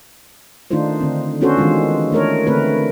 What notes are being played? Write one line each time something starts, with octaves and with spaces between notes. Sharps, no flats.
D#3 A3 D4 D#4 F4 C5
D3 C4
B3 C#4 D4 F#4 A4 C5
D#3 E3 G#3 F4
A3 D4 A#4 C#5
D3 A3 C4 A#4 B4